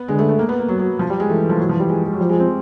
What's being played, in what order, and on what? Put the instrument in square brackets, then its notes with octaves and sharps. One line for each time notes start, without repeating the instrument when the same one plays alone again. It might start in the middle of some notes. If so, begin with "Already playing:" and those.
Already playing: [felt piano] B3
[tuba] D3 [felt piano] G#3
[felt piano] A3
A3
A#3
B3
A#3
F#3
F#3
F3
G3
G#3
[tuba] E3 [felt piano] A3
[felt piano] F3
F#3
F3
G3
G#3
G#3
F#3
[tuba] F3 [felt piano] G3
[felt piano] G#3
C4